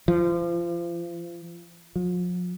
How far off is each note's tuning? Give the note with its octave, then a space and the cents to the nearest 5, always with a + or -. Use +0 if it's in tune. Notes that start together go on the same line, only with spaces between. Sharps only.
F3 -30
F3 +40